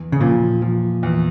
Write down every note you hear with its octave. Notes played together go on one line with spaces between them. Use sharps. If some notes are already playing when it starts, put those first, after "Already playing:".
Already playing: E2
C#3
A#2 F3
F3
E2